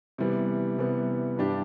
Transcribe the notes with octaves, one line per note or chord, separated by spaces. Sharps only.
C3 E3 G3 B3
C3 E3 G3 B3
G2 E3 G3 D4 G4